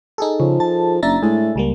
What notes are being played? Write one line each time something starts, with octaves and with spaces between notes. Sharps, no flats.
D#4 G#4 A4
C#3 F3
A5
F#1 D4 E5 A#5 A6
A2 G#3
C#2 G3 A#3